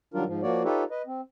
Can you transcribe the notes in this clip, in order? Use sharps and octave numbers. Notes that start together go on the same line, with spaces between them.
D#3 F#3 G3 D4 F4 A#4
G#2 F3
F3 A#3 F#4 C#5 D5
D#4 F4 G4 A4 B4 C#5
B4 D#5
C4